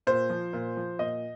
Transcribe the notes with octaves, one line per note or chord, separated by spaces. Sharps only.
A#2 C5
F3
A#2
F3
A#2 D#5